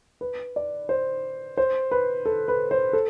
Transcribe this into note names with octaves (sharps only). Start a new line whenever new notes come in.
B4
D5
C5
C5
B4
A4
B4
C5
A4